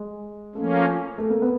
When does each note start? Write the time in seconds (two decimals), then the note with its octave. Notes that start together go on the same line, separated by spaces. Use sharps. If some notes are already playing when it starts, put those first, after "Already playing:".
Already playing: G#3
0.55 F3 A3 A#3 C#4
1.18 A3
1.30 A#3
1.42 B3